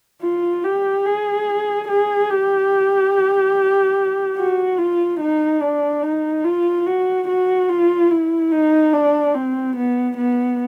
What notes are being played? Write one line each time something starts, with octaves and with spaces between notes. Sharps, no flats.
F4
G4
G#4
G#4
G4
F#4
F4
D#4
D4
D#4
F4
F#4
F#4
F4
E4
D#4
D4
C4
B3
B3